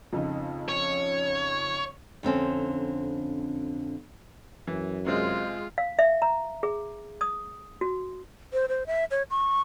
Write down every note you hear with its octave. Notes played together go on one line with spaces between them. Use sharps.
F2 C#3 D#4
C#5
F2 D3 C4 C#4
F#2 E3
C3 G#3 C4 F4
F5
E5
A#5
G#4
D#6
F#4
C5
C5
E5
C#5
C#6